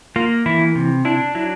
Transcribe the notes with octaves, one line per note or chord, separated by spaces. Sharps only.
A#3 F4
E3 E4
C3
D4 E4
F#3 E4